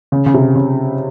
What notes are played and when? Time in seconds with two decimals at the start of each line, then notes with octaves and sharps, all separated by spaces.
0.12 C#3
0.26 C#3
0.34 C3
0.55 C#3